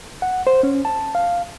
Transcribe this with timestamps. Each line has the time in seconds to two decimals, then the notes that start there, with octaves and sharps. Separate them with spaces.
0.22 F#5
0.47 C5
0.63 C#4
0.85 A5
1.15 F5